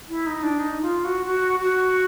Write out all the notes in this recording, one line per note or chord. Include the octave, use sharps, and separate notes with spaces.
E4
D#4
D4
D#4
F4
F#4
F#4
F#4